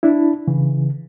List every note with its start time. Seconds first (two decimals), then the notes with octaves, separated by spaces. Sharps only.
0.03 D4 E4
0.48 C#3 E3